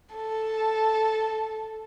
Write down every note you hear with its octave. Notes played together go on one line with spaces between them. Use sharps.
A4